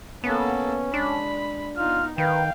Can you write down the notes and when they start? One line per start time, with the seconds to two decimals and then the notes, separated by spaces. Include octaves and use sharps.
0.24 A#3 B3 C#4 A4
0.94 G#3 D4 B5
1.77 B3 D#4 F4 F6
2.18 D#3 B4 F5 G5